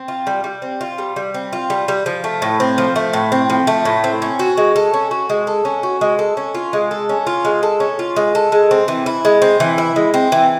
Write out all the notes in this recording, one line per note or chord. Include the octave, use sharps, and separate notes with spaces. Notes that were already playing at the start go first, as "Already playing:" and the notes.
Already playing: C4
F4
G3
G3
C4
F4
G3
G3
C4
F4
G3
G3
F3
A3
A2
C4
F3
A3
A2
C4
F3
A3
A2
C4
C#4
F#4
G#3
A4
C#4
F#4
G#3
A4
C#4
F#4
G#3
A4
C#4
F4
G#3
A4
C#4
F4
G#3
A4
C#4
F4
G#3
A4
G#3
C4
E3
E4
G#3
C4
E3
E4
G#3
C4
E3